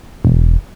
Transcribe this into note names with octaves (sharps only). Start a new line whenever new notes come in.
E1